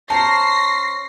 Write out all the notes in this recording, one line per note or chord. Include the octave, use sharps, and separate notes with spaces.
C#4 C5 A5 A#5 A#6 C7